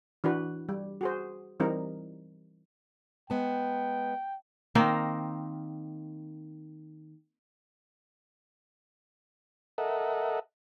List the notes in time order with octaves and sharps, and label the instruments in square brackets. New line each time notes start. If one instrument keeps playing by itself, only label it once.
[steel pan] E3 D4 F#4 B4
G3
F#4 G#4 C5
E3 G3 C4 D#4 A#4
[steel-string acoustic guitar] G#3 B3 A5 [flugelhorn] G5
[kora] D#3 A#3 C4 D#4
[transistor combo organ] A4 A#4 D#5 E5 F#5